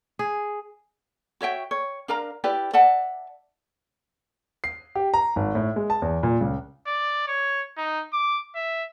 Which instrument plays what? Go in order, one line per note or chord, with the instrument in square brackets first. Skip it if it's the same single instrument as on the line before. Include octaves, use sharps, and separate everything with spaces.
[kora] G#4
[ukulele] F#4 C#5 E5 G5
C#5
D4 A#4 F5 A#5
E4 G4 B4 D5
D5 E5 F#5 A5
[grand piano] C7
G4
A#5
G#1
A2
G#3
A5
E2
A#2
C#2
[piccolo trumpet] D5
C#5
D#4
D6
E5